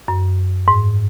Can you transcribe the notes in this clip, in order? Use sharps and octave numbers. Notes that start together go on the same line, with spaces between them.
F#2
G#2